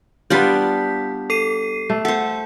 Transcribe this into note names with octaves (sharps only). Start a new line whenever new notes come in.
G3 B3 D4 F4 D5 G6 B6
A4 C7 D#7
A3
A4 C5 F#5